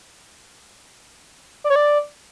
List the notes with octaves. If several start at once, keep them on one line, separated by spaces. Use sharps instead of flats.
D5
C#5
D5